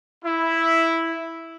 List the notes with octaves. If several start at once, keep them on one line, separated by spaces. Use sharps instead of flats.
E4